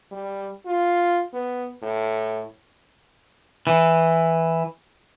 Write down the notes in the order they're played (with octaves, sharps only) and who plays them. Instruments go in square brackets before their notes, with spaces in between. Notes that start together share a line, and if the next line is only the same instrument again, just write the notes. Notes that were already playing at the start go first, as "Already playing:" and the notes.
[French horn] G3
F4
B3
A2
[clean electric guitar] E3